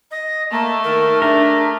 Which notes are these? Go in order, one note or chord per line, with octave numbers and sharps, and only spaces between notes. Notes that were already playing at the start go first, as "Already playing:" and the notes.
D#5
A3 A#3 A5
D#3 A#4
D4 G4 G#4 A#4 E5